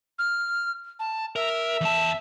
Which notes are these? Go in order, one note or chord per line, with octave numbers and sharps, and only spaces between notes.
F6
A5
A#4 E5
E2 A5